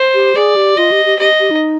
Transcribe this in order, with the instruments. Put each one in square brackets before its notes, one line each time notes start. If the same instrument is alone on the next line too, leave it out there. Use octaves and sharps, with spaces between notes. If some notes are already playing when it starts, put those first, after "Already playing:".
Already playing: [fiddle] C5
[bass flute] G4
[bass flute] G#4 [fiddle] D5
[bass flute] G4
[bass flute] F4 [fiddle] D#5
[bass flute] G4
G4
[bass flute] G4 [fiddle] D#5
[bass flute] G4
D#4